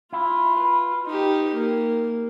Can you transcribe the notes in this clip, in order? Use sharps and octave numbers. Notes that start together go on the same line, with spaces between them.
E4 F4
B4
D#4 G4
A#3